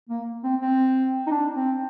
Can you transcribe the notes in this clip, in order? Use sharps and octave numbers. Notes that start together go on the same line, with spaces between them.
A#3
C4
C4
D#4
D4
C4